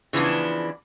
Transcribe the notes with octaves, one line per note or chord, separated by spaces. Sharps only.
C#3 E3 F3 B3 D4